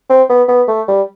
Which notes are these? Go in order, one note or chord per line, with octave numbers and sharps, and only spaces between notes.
C4
B3
B3
A3
G3